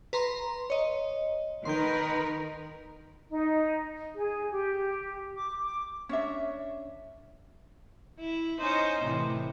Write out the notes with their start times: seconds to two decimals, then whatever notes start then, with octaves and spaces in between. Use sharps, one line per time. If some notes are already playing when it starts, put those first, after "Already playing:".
0.13 B4 A#5 C6
0.70 C#5 D#5
1.65 D#3 A#4 B4 C6 G6
3.30 D#4
4.16 G#4
4.51 G4
5.38 D6
5.64 D6
6.09 C#4 D4 E5
8.19 E4
8.59 C#4 D#4 C5
9.03 A2 C3 E3